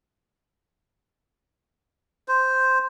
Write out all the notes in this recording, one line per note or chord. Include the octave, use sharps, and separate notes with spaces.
C5